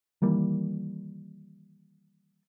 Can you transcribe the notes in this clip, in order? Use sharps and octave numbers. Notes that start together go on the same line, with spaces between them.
D#3 E3 G3 A#3